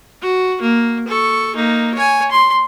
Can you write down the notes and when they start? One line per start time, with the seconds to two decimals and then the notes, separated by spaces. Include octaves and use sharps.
0.22 F#4
0.62 A#3
1.08 A4 C#6
1.56 A#3 D#4
1.94 C#5 G#5
2.31 C6